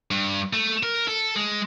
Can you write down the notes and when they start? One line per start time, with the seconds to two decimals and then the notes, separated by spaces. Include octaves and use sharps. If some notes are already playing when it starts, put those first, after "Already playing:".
0.11 G2
0.53 A3
0.83 A#4
1.08 A4
1.36 G#3